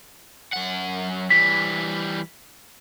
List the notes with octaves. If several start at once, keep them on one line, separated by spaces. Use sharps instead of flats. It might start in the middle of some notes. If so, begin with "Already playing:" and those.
F#2 F#5
E3 G3 B6